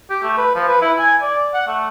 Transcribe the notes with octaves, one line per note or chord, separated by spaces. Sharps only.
G4
A3
B4
F3
B4
E4
G#5
D5
F#5
A3